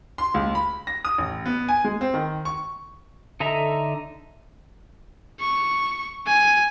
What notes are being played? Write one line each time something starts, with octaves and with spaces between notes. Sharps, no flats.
C6
C#2
B5
A#6
D#6
A1
B3
G#5
G#3
C4
D#3
C#6
D3 D#4 A4 E5 A#5
C#6
G#5